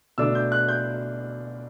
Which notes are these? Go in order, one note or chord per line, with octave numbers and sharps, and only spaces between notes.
B2 A3 D4 E6
G6
F#6
G6